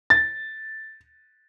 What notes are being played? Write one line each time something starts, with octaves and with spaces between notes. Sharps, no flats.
A6